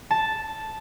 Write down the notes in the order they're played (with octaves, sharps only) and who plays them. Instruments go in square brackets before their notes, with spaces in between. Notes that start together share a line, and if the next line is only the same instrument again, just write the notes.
[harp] A5